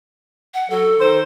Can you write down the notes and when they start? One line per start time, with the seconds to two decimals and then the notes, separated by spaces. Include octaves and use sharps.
0.54 F#5
0.70 F#3 A4
0.99 D#3 C5